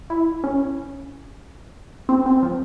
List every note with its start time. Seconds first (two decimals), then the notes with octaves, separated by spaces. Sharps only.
0.10 E4
0.44 C#4
2.09 C4
2.26 C4
2.43 F3